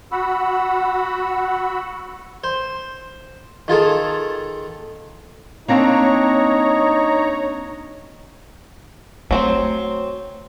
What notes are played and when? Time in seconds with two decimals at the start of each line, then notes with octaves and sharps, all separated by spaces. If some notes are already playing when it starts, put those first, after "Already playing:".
0.12 F#4 F#5 B5 E6
2.44 C5
3.68 D#3 F4 G#4 A4
5.68 A#3 C4 D4 D#4 C#5 A#5
9.31 F#3 A3 C4 C5